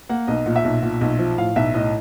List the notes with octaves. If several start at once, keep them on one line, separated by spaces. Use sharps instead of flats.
A#3 F#5
B1 D#5
A#2
E5
B1
A#2
B1
F3
A2 F5
B1 E5
A2 D#5